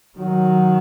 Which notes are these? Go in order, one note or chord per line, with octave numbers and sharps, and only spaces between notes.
D#3 F#3